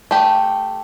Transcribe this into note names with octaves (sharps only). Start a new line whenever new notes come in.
A3 G4